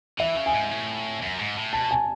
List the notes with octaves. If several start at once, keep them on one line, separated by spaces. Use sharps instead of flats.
E3 E5
C#3
G#5
G#2
A2
F#2
G#2
A2
B2 A5
G#5